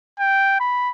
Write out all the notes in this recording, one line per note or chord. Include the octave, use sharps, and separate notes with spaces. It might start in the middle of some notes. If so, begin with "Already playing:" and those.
G5
B5